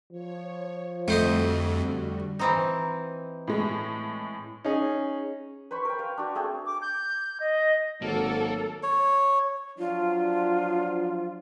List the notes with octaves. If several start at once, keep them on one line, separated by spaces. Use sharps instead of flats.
F3 C#5
F2 D3 G3 A3 F#4 C5 D#5
E3 C4 D#4
A2 G#3
C#4 D#4 G#4
B4 C5 B5 C#6
A#4 G5
B4 F5
D4 F#4
A3 C4 G#4 C5
D6
G6
D#5
G#1 F#3 A#3 A4
C#5
F3 F#3 D4 F4